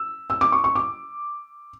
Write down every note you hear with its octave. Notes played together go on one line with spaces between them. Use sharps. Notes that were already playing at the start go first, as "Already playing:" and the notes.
Already playing: E6
E6
D6
C#6
C#6
D6